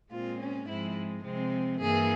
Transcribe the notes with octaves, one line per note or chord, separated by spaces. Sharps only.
A#2 G#3 C4 F4
C#4
G#2 F3 G#3 C4 E4
C3 F3 G#3 C4
G2 E3 A#3 G#4